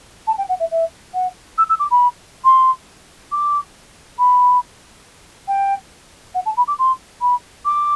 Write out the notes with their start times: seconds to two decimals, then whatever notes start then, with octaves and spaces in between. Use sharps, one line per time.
0.27 A5
0.38 G5
0.49 F#5
0.60 E5
0.71 E5
1.14 F#5
1.58 E6
1.69 E6
1.79 D6
1.91 B5
2.44 C6
3.32 D6
4.19 B5
5.48 G5
6.35 F#5
6.46 A5
6.57 B5
6.68 D6
6.79 C6
7.21 B5
7.65 D6